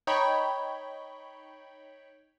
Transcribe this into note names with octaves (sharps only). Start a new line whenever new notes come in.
D#4 C#5 G5 B5